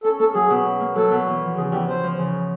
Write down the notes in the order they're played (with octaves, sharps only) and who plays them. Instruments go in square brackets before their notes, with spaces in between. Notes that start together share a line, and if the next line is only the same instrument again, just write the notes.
[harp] C#4 [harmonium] A4
[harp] A#3 [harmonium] A4
[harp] F#3 [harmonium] G#4
[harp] B2
C#4
A#3
[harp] F#3 [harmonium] A4
[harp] B2
E2
F3
[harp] C#3 [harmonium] G#4
[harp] E2 [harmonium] G4
[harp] E2 [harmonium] C5
[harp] F3
C#3